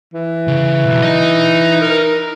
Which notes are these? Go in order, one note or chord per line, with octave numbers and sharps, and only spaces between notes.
E3
C#3
B1
D#4 D#5
A#4